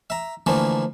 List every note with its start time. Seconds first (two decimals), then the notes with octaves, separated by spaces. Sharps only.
0.10 E5 A#5
0.46 D3 E3 F3 A3 A#3